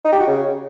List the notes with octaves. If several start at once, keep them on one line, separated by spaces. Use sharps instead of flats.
D#4
G4
F#4
C#3